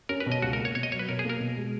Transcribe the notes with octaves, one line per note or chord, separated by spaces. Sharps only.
C#4 A#4
B4
B2
D#5
C#2 F#4
A#4
A#3
C#5
B2 C#5
D#5
F#3 C#5
B4
B2 A#4
G#4
A#3 A#4
B2
G#3